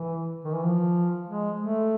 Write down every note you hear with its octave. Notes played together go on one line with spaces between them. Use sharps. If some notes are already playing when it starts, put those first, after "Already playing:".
Already playing: E3
D#3
E3
F3
G#3
A3